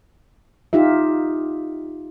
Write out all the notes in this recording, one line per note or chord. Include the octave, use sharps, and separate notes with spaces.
D#4 F4 G4 E5